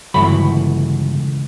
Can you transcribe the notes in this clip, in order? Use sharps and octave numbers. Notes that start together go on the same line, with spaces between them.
G1 C#2 E3 F#3 A3 B5